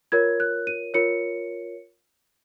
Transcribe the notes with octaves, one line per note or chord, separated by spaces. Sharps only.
F4 A#4 C#5 G#6
F#6
D#7
F4 A#4 C#5 C#7